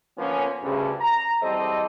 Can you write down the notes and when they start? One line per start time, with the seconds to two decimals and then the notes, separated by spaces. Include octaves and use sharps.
0.18 D3 F3 A#3 B3 C#4
0.63 D2 G2 C#3
1.01 A#5
1.42 E2 G3 C4 A4 C5 D#5